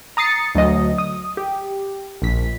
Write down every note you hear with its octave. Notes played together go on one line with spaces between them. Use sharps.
A#5 D#6 A6 C7 C#7
D2 F#3 D#5
D#6
G4
A#1 B6